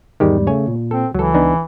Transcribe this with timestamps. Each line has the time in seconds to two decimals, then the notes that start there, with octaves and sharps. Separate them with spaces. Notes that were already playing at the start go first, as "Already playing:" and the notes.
0.20 E2 G#2 D#3 G3 G#3 G4
0.47 C#3 A3 C#5 G#5
0.68 A#2
0.91 C4 A4
1.15 C#2 E3 F#3 A4
1.34 B3 D4 D#4